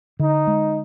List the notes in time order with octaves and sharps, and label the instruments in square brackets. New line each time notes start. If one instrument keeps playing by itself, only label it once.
[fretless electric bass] D3 [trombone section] D#4
[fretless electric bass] G#3